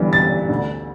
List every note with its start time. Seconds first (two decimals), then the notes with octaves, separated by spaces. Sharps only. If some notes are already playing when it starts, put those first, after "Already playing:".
Already playing: G1 G2 E3
0.13 A6
0.49 D2 D3